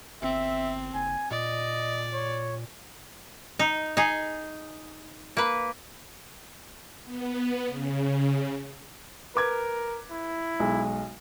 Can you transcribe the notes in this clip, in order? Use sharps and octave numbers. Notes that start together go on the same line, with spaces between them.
G1 C4 E5
F#1 G#5
A#2 D5 D#5
C#5
D#4
D#4 G#4
A#3 B4
B3
C#3
A#4 B4 D6 G#6
E4
B1 G#3